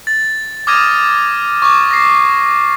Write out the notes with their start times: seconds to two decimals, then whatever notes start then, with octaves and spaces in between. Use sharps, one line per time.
0.07 A6
0.67 D6 D#6 F6 G#6 A#6 D#7
1.62 C#6 D6
1.91 A#6 C7